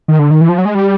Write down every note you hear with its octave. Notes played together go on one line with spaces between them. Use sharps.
D#3
D3
D#3
E3
F3
F#3
G#3
G3